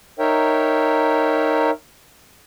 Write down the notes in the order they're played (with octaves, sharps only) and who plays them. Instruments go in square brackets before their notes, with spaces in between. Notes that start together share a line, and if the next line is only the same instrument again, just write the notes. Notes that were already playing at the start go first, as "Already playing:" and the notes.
[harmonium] D#4 A#4 C#5 E5 G5